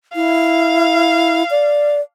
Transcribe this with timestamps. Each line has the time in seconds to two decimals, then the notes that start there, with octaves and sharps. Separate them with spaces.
0.15 E4 F5
1.51 D5